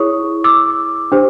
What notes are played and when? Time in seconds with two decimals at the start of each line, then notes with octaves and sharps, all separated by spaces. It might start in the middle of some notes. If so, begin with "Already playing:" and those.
Already playing: E4 G#4 C#5 C#6 D#6
0.44 D6 E6
1.12 D4 G4 C5